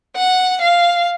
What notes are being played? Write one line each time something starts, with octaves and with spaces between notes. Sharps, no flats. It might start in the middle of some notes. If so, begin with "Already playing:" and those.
F#5
F5